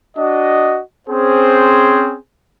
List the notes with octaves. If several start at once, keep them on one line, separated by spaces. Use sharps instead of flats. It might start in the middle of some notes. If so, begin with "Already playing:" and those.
D4 F#4 D#5
C4 C#4 G#4 C5